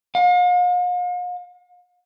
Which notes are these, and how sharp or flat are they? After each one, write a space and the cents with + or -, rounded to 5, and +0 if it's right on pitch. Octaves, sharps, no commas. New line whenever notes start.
F5 +45